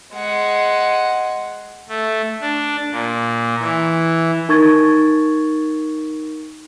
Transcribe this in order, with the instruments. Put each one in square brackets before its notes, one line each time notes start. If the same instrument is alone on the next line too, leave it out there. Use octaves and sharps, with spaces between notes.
[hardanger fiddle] G#3 F#5
[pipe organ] A3
D4
A#2
E3
[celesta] D#4 A#4 C#6 G#6 A6